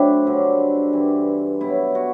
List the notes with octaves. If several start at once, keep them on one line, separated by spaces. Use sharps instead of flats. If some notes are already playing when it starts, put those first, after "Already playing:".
Already playing: A2 F#3 C4 D4 E4
G2 D3 F#3
G2 E3
B2 F#3 E4
F#4